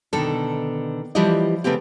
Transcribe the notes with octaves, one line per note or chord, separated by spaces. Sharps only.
B2 D3 D#3 A4
E3 F3 G3 G4 D5 D#5
C#3 A3 B3 C4 G4